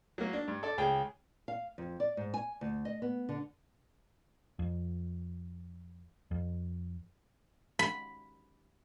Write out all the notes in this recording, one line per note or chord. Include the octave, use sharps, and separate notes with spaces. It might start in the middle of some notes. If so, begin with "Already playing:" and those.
F#3 A#3
D4
G2
A4 D5
C#2 G#4 G5
F5
F2
D5
G#2
G#5
D2
D#5
B3
D3
F2
F2
B5